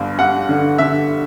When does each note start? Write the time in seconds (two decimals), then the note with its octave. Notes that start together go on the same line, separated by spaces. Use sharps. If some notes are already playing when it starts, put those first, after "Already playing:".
Already playing: G1 G2
0.19 G2 F#5
0.49 D3
0.78 D3 E5